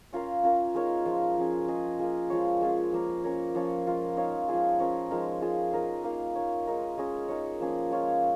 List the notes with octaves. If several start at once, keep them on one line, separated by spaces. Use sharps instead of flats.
C#4 F4 A#4 F5
C#4 F4 A#4 F5
G#3 D#4 A#4 C#5
F3 G#3 F4 A#4
F3 C#4 G#4
C#4 G#4 D#5
A#3 F4 G#4
F3 G#3 F4 C#5
G#3 C#4 F4 G#4
F3 A#3 C#4 A#4
C#4 A#4 C#5
F3 C#4 F4 C#5
G#3 F4 A#4
D#4 C#5 F5
F3 G#3 F4 G#4
F3 C#4 A#4 C#5
F3 G#3 D#4 A#4
G#3 F4 G#4
D#4 A#4 D#5
A#3 D#4 A#4 F5
A#3 D#4 C#5
G#3 D#4 A#4 D#5
G#3 C#4 G#4 D#5
G#3 D#4 A#4 C#5
F3 A#3 C#4 G#4
G#3 F4 C#5 F5